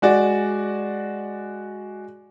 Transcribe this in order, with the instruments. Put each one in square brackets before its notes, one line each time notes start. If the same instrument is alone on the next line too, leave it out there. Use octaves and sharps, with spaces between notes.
[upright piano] G#3 F#4 D5